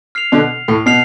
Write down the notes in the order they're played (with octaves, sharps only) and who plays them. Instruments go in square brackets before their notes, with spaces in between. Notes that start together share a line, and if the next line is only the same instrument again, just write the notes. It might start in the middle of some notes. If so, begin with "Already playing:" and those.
[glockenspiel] F6 C7 F7
[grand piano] B2 D3
A2
[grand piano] B2 [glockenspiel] F6 C7 F7